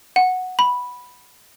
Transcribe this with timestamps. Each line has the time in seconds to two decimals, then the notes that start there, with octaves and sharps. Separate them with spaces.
0.16 F#5
0.59 B5